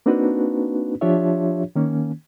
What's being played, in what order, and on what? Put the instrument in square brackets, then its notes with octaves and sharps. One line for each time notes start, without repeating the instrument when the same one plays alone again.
[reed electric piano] A#3 C4 D4 D#4 F#4 B4
F3 D4 F4 G4 C#5 E5
D#3 A#3 C#4